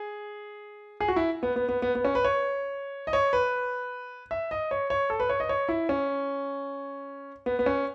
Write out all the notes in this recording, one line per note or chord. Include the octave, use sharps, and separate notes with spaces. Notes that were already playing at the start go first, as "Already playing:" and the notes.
Already playing: G#4
G#4
F#4
E4
B3
B3
B3
B3
B3
C#4
B4
C#5
D#5
C#5
B4
E5
D#5
C#5
C#5
A4
B4
C#5
D#5
C#5
E4
C#4
B3
B3
C#4